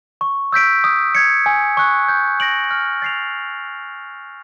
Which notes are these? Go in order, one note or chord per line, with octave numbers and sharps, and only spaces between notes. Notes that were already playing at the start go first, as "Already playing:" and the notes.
C#6
E6 G6 B6 D7
D#6
G#6 C#7
G#5
C#6 F#6
G6
A#6 D7 F#7
F6
A6 C7 F7